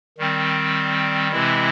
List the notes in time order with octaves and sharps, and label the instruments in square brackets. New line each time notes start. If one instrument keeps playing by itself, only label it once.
[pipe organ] D#3 G3 C4
C3 E3 G#3 C4 E4